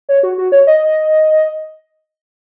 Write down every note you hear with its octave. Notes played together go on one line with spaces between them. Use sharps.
C#5
F#4
F#4
C#5
D#5